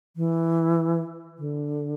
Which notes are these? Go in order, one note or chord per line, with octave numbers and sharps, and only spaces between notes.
E3
D3